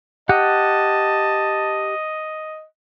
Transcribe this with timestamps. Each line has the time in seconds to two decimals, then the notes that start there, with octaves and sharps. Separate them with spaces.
0.29 G4 D#5 F#5 A5